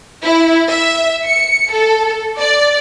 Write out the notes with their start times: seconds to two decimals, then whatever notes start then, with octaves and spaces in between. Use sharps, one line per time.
0.22 E4
0.70 E5
1.26 C#7
1.73 A4
2.39 D5